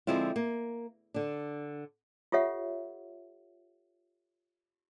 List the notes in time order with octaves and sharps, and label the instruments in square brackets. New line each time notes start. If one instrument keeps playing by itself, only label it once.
[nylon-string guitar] D3 F3 G#3 C4 E4 F4
A#3
D3 D4
[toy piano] F4 G4 A4 C#5 E5 F#5